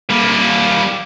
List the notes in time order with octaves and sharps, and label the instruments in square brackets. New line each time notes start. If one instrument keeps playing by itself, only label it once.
[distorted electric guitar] G3 A#3